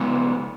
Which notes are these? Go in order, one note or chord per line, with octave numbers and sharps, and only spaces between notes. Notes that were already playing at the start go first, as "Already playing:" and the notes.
Already playing: C#3 G#3 B3